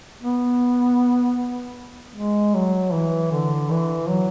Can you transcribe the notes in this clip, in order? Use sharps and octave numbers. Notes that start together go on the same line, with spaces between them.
B3
G#3
F#3
E3
D3
E3
F#3